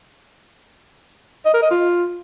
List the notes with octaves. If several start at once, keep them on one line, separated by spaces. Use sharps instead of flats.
D#5
A#4
D#5
F4